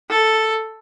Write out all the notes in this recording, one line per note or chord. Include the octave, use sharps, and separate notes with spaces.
A4